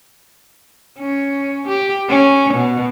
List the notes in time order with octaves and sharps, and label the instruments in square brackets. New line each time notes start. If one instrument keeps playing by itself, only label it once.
[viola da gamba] C#4
G4
C#4
B2